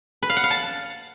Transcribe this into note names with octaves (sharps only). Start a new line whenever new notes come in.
B4
F5
F#5
F5
A5